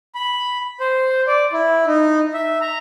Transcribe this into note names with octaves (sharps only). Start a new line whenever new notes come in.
B5
C5
D5
E4
D#4
E5
A#5